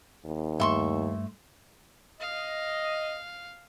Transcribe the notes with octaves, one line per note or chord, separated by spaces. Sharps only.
D#2
G2 A3 E5 C6 C#6
D#5 F5